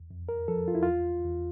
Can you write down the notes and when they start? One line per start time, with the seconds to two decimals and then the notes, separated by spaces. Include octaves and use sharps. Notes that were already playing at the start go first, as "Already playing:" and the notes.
Already playing: E2
0.11 F2
0.29 A#4
0.48 F3 A4
0.68 F4
0.75 E4
0.83 E2 F4
1.25 E2